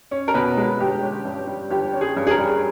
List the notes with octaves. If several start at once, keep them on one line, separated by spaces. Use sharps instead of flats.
C#4
A#4
B2 B4
G#3
G1 G4
C#4
G2
G3
G1 G4
C#4
G#4
G2
G#4
A#4
G3